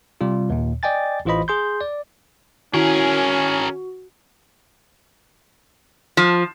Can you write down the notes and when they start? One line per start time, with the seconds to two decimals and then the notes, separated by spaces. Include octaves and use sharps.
0.21 C3 G3 F4
0.50 D#2 A#2
0.83 D5 D#5 G5 G#5 A6
1.25 A1 E3 F4 C5 D#5 B5
1.48 G#4 C6 G6
1.81 D5
2.74 D#3 C#4 E4 F#4 G#4 A#4
6.17 F3